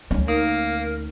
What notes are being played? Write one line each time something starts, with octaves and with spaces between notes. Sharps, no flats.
D2 C#4
A#3 D#4 A#4